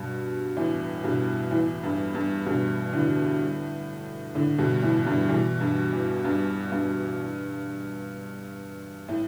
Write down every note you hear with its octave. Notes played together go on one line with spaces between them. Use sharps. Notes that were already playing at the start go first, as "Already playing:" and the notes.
Already playing: G2 B2
E2 A2
G2 B2
E2 A2
G2
G2
G2 B2
A2 D3
A2 D3
G2 B2
E2 A2
G2 B2
B2 E3
G2
E2
G2
G2
A2